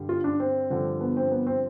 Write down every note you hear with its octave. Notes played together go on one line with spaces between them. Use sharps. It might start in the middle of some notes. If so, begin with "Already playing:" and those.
Already playing: G2 D3 G3
F4
D4
C4
G2 D3 F3
B3
C4
B3
C4